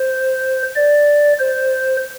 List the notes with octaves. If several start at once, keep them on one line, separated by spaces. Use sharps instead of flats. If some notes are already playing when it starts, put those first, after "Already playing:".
Already playing: C5
D5
C5